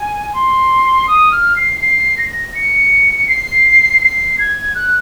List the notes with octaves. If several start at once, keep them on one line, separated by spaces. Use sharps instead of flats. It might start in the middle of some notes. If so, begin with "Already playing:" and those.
Already playing: G#5
C6
D#6
F6
C7
C7
A#6
C#7
C7
C7
G#6
F#6